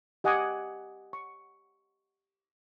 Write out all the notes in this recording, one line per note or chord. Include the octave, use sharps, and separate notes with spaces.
G4 D#5 F#5 G#5 D6 D#6
C#6